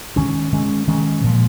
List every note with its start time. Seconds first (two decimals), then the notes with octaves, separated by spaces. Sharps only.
0.16 D#3 G#3 C#4
0.52 D#3 G#3 C#4
0.88 D#3 G#3 C#4
1.24 A#2 F3 G#3